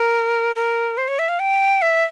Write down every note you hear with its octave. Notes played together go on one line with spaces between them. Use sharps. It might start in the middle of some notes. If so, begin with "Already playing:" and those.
Already playing: A#4
A#4
C5
C#5
E5
F5
G5
E5